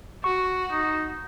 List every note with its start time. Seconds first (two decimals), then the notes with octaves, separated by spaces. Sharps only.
0.24 F#4 C#6
0.71 D#4